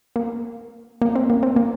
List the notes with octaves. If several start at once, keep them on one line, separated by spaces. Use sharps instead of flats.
A#3
A#3
C4
A#3
C4
A#3